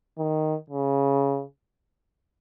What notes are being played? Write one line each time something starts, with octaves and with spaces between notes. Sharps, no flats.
D#3
C#3